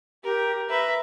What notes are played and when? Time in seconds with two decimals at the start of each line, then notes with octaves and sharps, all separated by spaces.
0.24 G4 A#4
0.70 B4 E5 A#5